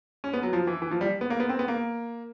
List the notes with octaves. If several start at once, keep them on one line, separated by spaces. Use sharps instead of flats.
C#4
B3
F#3
F3
E3
E3
F3
G3
B3
A#3
B3
C4
B3
A#3